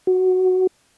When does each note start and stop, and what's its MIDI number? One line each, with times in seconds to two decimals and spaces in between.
0.07 0.67 66